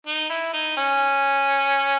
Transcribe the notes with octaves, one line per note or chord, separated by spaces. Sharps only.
D#4
E4
D#4
C#4